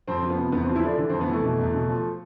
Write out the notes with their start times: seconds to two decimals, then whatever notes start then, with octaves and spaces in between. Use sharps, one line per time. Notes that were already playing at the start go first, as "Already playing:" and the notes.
0.08 F2 C4
0.22 F3
0.30 B3
0.37 C3
0.52 E2 B3
0.64 C4
0.68 F3
0.75 E4
0.83 D3 D4
0.98 E3
1.09 C4
1.13 F2
1.21 B3
1.29 E3 A3
1.43 B2
1.59 E2
1.73 B2
1.89 F3